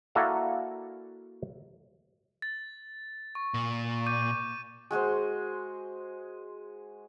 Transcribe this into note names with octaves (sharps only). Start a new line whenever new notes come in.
A#3 E4 F#4 A4 D5 F5
A6
C#6
A#2
D6 G6 D#7
G#3 F#4 G#4 C5